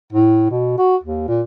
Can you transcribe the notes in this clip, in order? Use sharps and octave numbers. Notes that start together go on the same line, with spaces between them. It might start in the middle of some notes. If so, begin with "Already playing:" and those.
A2
B2
F#4
D#2
A#2